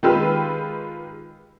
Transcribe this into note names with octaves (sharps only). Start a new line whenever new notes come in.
D#3 G#3 F4 G4 B4 E6